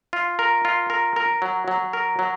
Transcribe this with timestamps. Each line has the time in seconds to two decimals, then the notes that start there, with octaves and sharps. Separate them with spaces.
0.13 F4
0.39 A#4
0.65 F4
0.90 A#4
1.16 A#4
1.42 F#3
1.68 F#3
1.93 A#4
2.19 F#3